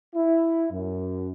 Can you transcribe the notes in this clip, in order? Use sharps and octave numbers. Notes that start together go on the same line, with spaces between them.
E4
F#2